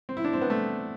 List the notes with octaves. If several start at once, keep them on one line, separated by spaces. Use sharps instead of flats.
C4
E4
D4
C4
B3
A3